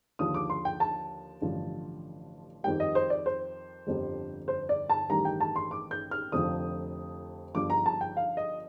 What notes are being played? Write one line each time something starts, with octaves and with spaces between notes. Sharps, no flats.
D#2 D3 F3 D#6
D6
C6
G5
A5
A1 G2 D3 F3
F2 D#3 G3 G5
D#5
C5
D5
C5
G1 F2 D3 G3
C5
D5
A5
A1 G2 D#3 G3 A#5
G5
A5
C6
D6
G6
F6
F1 F2 D3 F3 D#6
G1 G2 F3 D6
A#5
A5
G5
F5
D#5